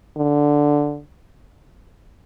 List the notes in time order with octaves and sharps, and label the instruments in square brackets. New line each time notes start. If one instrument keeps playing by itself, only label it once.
[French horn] D3